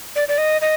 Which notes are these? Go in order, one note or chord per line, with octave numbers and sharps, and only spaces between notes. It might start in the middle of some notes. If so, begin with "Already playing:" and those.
D5
D5
D#5
D#5